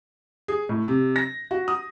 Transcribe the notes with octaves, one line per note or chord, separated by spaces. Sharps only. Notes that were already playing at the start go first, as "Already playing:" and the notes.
G#4
A2
C3
A#6
F#4
D#6